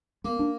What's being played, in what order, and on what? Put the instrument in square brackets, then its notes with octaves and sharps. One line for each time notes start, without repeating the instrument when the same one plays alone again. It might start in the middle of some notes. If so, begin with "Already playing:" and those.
[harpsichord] A#3 [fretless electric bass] B3
[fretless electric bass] D4